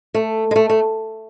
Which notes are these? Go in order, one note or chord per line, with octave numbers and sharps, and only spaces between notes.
A3
G#3
A3
A3